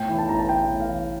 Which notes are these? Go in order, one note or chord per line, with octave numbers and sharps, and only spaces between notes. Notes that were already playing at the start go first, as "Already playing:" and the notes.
Already playing: A2 G5
E3
A5
A1 A#5
A5
A1 G5
A2
F5
E3